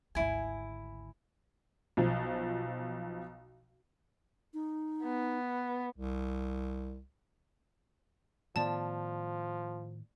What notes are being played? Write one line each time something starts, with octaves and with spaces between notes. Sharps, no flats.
G#1 D2 E4 G#5
B1 F3
D#4
B3
C2
A2 D#3 F3 B3 D5 A5